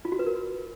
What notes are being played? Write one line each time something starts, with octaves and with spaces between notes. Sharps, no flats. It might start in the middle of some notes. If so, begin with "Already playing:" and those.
F4
F#4
B4
A#4